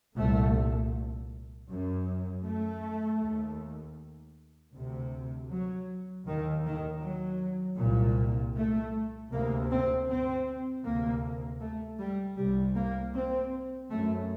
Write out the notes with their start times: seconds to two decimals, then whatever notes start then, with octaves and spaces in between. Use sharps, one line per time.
0.17 C2 A#2 A3
1.69 F#2
2.46 A3
3.22 D#2
4.75 D2 C3
5.51 F#3
6.27 D#2 D#3
6.66 D#3
7.04 F#3
7.80 C2 A#2
8.56 A3
9.32 D2 C3 A#3
9.71 C4
10.09 C4
10.85 D2 C3 A#3
11.61 A3
12.00 G3
12.38 C2 C3 G3
12.76 A#3
13.14 C4
13.90 F#2 A3